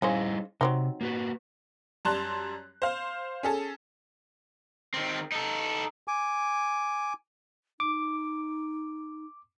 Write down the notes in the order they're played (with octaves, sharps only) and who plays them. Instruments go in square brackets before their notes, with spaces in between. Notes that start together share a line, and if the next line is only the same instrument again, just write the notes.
[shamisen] C#3 C#4 C5 [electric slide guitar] G3 D#4 E4
[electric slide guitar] C3 [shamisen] F#3 C4 D#4
[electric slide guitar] A#3 F#4 B4
[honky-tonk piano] F#2 G3 A5 A#5 C6 F#6
C5 F5
C#4 G#4 A4
[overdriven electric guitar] D#3 C4
D#4 A4
[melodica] G#5 D6
[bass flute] D#4 [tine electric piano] D6